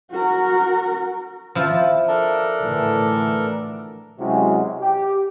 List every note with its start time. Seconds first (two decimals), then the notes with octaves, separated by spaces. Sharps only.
0.11 F#4 A#4
1.55 F3 E4 A5
2.08 D4 A4 A#4
2.59 A2 D3 E3
4.19 C3 F#3 G#3 C#4 E4 F#4
4.81 G4